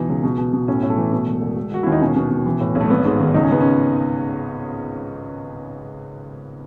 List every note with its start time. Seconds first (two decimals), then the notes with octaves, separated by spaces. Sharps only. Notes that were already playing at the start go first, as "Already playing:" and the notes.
Already playing: B2 E3 D#4
0.09 C#2
0.23 B2
0.38 B2
0.53 B2
0.68 A2 C#4
0.83 A2
0.90 A3
0.98 E3
1.12 B2
1.27 E1
1.42 E1
1.57 E1
1.72 E1 F#4
1.83 D#2 E4
1.92 D#4
2.01 B2 C#4
2.16 B2
2.31 B2
2.46 E3
2.60 A2
2.75 B1
2.80 A3
2.90 G#1 B3
3.05 G#2
3.20 D#3
3.34 C#2 D#4
3.43 C#4
3.50 C#2 B3
3.61 C#4